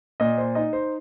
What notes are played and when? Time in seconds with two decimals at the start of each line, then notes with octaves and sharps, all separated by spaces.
0.20 A#2 D#5
0.38 C5
0.55 D#4 D#5
0.73 C5